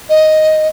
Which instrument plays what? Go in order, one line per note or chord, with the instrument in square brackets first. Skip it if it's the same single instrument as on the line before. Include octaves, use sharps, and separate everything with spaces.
[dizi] D#5